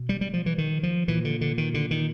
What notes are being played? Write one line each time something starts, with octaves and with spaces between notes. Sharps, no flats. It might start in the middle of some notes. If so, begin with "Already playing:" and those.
Already playing: B2
G3
G3
F3
E3
D#3
F3
A#2 E3
D3
D3
D#3
D3
D#3